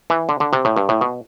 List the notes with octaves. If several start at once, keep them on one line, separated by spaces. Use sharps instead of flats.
E3
D3
D3
C3
A2
G2
A2
B2